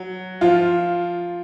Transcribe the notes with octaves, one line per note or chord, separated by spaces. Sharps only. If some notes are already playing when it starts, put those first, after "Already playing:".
Already playing: F#3
F3 F4